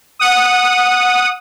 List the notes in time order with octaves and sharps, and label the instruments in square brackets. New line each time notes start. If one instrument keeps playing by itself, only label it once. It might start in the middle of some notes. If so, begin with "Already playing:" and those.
[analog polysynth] F#5 D#6